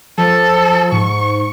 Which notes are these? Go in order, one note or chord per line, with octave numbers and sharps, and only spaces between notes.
F3 A4
G#2 C#6